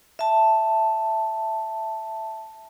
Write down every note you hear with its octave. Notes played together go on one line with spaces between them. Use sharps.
E5 A5